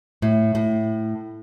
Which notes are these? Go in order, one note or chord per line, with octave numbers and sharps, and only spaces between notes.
A2
A2